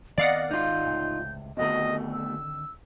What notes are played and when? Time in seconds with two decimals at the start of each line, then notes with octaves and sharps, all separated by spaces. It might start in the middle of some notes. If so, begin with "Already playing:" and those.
0.18 D#3 B3 C4 D5 D#5 F5 F#5
0.51 G#1 G#3 D#4 F4 G6
0.84 C#2 A2 C3
1.57 B1 B2 D3 D#3 A3 C4 D#5
2.13 E6